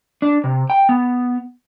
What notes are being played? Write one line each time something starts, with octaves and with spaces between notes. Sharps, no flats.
D4
C3
G5
B3